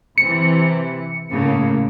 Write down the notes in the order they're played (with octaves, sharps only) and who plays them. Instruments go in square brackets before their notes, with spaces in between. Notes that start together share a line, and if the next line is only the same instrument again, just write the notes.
[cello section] C3 E3 [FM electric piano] C#7
[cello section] A2 C#3 A#3